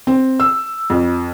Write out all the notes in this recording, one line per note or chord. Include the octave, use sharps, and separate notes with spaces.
C4
E6
F2